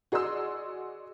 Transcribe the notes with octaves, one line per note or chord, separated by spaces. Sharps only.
F#4 G#4 D5 D#5 C6 E6